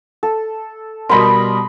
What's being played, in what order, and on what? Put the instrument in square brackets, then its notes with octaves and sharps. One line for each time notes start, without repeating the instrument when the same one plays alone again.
[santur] A4
[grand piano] B2 G3 A#4 [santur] D#5 B5 C6